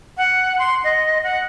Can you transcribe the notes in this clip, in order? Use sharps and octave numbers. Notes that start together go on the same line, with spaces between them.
F#5
C6
D#5
F#5